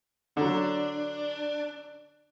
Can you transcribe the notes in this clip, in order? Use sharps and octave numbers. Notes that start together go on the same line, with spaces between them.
D3 F#3 D4